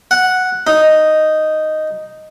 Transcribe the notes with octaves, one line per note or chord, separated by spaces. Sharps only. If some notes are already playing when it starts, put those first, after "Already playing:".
F#5
D#4